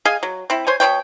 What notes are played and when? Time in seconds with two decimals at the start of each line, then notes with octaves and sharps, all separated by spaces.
0.05 G#4 D#5 F5 G#5
0.23 F#3
0.50 C4 E4
0.67 C5 C#5 G#5
0.80 B2 C4 C#5 G5